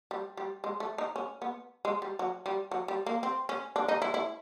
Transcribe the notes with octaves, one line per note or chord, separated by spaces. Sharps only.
G3
G3
G#3
A3
D#4
C#4
B3
G#3
G3
F#3
G3
F#3
G3
A#3
C4
C#4
D4
D#4
E4
E4